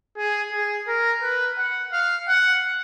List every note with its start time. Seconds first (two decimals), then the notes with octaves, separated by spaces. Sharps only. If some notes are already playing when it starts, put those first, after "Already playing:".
0.18 G#4
0.52 G#4
0.88 A#4
1.23 B4
1.58 F#5
1.93 F5
2.28 F#5